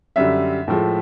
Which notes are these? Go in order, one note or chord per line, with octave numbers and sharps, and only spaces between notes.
F#2 D3 G3 E5
A2 F3 G#3